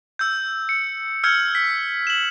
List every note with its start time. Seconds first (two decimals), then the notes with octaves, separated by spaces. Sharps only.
0.19 E6 G6
0.69 C#7
1.24 E6 F6 G6 G#6 C#7
1.55 B6
2.07 E7 F#7